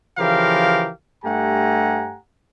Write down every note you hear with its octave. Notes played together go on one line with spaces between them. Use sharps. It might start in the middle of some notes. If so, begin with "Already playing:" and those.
C#3 E3 F3 G4 A#4 F5
G2 A3 G4 F#5 G#5 A#5